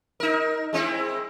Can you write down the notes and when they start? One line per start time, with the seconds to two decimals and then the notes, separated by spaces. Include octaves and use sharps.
0.20 D#4 A#4
0.73 G#3 C4 E4